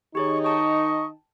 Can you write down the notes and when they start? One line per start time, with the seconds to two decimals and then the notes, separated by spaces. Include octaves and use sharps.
0.15 D#3 D#4 G4 G#4 C#5 C#6
0.44 D#5 G5 A5 C#6